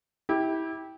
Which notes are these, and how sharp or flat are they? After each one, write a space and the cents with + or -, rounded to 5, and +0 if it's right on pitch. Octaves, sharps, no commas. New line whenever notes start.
E4 -25 G4 +0